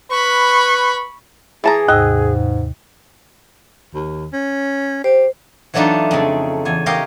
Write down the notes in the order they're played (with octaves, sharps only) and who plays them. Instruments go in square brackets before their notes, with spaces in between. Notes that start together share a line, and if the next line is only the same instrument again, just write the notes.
[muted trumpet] B4 [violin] B5 C#6
[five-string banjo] E3 A5 A#5 [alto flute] G#4
[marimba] D#2 C3 [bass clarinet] G#2 [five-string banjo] D#5
[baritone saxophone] D#2
C#4
[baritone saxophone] G4 [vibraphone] C5
[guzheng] E3 F#3 A3 D4 D#4 F4
F2 C#3
E2 G#5
G4 A#4 C#5 D#5 F5 G5